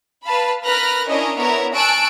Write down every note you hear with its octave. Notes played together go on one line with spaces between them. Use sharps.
B4 F5 A5 B5
A#4 B4 B5 F6 F#6 A#6
C#4 D4 E4 A#4 C#5 D#5
B3 E4 A#4 C#5 A#5
G#5 A5 C#6 E6 F#6 D7